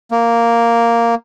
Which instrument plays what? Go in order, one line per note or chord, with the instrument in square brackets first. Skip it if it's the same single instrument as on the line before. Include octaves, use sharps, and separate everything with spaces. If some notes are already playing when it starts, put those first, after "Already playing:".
[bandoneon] A#3